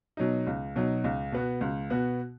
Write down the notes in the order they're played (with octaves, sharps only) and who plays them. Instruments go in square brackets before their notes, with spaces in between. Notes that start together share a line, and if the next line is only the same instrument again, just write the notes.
[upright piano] B2 F#3 D#4
C#2
B2 F#3 D#4
C#2
B2 B3 F#4
C#2
B2 B3 F#4